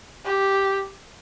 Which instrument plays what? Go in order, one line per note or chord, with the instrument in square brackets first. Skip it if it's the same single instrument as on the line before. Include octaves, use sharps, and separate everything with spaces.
[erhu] G4